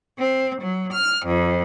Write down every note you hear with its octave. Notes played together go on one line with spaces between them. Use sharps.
C4
F#3
F6
F2